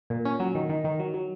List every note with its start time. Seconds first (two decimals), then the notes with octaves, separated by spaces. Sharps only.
0.10 A#2
0.25 C#4
0.40 F#3
0.55 D#3
0.69 D#3
0.84 D#3
0.99 F#3
1.14 F#3